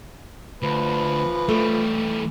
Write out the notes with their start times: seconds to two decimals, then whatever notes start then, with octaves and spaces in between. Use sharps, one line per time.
0.62 D2 F3 B4
1.49 E3 G3 A3